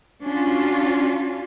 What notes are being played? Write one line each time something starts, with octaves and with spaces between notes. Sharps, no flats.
C#4 D4 F4 F#4